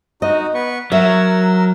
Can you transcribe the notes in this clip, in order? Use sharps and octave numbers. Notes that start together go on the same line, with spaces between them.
D#4 F#4 D#5
B3 B4 C#6
F#3 A#4 E5 E6